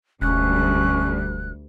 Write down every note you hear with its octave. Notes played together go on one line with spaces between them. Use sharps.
E1 D2 G3 C#4 F#6